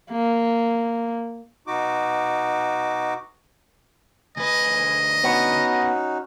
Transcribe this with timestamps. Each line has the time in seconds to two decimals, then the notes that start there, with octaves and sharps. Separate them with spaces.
0.11 A#3
1.67 B2 D#4 F#4 D6
4.37 D2 B4 D#5 G#5
5.24 B3 C#4 D#4 F#4